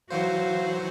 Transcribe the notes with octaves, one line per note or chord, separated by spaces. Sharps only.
E3 F#3 F#4 C5 F5